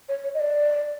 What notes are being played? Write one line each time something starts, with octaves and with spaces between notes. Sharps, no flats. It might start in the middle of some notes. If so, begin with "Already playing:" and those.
C#5
C#5
D#5
D5